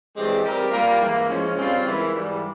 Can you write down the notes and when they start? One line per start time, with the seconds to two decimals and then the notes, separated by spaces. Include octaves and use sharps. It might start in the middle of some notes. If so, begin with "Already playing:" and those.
0.15 G2 E3 G#3 C4 G4
0.43 G3 C4 G4 A#4
0.72 G3 A#3 F4 A#4
1.00 G#2 E3 A#3
1.28 F3 G#3 C#4
1.56 C#3 G3 C4 F4
1.85 E3 G#3 E4 A#4
2.13 G#2 E3 G3